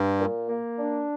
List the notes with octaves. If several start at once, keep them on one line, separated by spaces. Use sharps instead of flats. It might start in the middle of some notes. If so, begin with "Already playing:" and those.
Already playing: G2 G3
A#2
A#3
D4